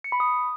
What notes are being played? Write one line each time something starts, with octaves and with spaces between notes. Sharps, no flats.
C#7
B5
D#6